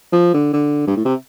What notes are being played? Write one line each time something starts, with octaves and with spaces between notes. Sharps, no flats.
F3
D3
D3
G2
A2
C3